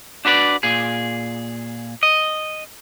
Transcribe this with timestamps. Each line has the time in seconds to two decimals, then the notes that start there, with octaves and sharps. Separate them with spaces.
0.25 D4 F#4 B4 C#5 D5
0.63 A#2 G#4
2.03 D#5